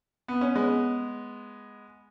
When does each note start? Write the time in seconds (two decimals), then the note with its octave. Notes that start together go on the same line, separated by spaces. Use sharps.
0.28 B3
0.41 C#4
0.55 G#3 B3